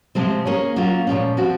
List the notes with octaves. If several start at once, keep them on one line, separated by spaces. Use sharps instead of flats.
C3 F3 G#3 C4
A#3 C#4 G#4 C#5
F#3 A#3 C#4 F4
A#2 F3 G#3 C#4
F3 C4 F#4